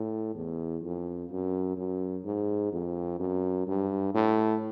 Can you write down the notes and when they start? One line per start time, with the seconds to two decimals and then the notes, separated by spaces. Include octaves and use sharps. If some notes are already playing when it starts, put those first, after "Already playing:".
Already playing: A2
0.35 E2
0.83 F2
1.31 F#2
1.77 F#2
2.25 G#2
2.72 F2
3.20 F#2
3.67 G2
4.14 A2